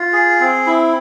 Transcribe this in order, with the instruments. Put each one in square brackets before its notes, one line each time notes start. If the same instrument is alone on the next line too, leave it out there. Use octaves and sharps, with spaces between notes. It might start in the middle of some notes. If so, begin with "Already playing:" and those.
Already playing: [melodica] F4
G#4
C4
E4